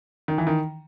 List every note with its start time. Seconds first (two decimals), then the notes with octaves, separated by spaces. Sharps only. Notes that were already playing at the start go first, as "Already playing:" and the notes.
0.28 D#3
0.38 E3
0.47 D#3